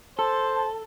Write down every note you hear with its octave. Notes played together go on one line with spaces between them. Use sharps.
A4 C5 A5